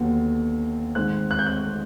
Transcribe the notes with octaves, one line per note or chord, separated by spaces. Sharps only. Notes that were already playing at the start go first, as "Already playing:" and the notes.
Already playing: D#2 D3 F#3 B3
G#2 D#3 G#3 C4 F#6
F#6
G6
F#6